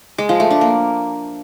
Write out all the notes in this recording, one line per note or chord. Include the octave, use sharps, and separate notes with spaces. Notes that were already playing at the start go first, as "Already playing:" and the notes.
G#3
F3
A3
D4
A#3